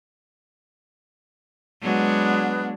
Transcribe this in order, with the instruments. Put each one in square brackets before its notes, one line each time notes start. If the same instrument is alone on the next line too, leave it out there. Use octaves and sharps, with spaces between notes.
[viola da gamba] F#3 G#3 D4 [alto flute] B3